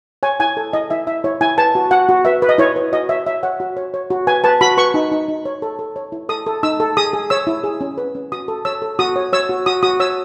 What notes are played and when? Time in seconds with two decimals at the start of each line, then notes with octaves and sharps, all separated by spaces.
0.23 C#5 G#5
0.40 E4 G#5
0.57 A4
0.73 E4 D#5
0.90 E4 E5
1.07 E4 E5
1.24 E4 C#5
1.41 E4 G#5
1.58 B4 A5
1.75 F#4
1.91 F#4 F#5
2.09 F#4
2.25 B4 E5
2.42 B4
2.49 D#5
2.58 E4 C#5
2.76 B4
2.93 F#4 D#5
3.09 C#5 E5
3.26 C#5 E5
3.43 C#5 F#5
3.60 F#4
3.77 C#5
3.94 C#5
4.10 F#4
4.27 B4 G#5
4.44 B4 A5
4.61 F#4 B5
4.78 B4 C#6
4.94 D#4
5.12 D#4
5.28 D#4
5.45 C#5
5.62 A4
5.79 A4
5.96 C#5
6.12 E4
6.29 A4 D#6
6.46 A4
6.63 D#4 E6
6.80 A4
6.97 G#4 D#6
7.13 G#4
7.30 C#5 E6
7.47 E4
7.64 G#4
7.81 C#4
7.98 B4
8.15 C#4
8.32 F#4 D#6
8.48 A4
8.65 C#5 E6
8.82 A4
8.99 F#4 D#6
9.16 C#5
9.33 C#5 E6
9.49 F#4
9.66 F#4 D#6
9.83 F#4 D#6
10.00 C#5 E6